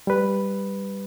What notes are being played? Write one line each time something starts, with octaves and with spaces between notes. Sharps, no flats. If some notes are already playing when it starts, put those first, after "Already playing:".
G3 B4